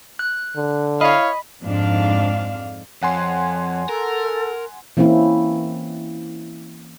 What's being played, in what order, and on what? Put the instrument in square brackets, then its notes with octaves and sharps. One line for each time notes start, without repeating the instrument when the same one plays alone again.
[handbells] F#6
[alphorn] D3
[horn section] E4 C#5 F5 [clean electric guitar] D#5 [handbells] B5
[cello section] F2 G#2 D4 F5
[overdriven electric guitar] F2 [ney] C#5 [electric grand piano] F#5 G#5 C6
[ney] A4 [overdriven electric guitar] A#4
[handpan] E3 A#3 C4 C#4 E4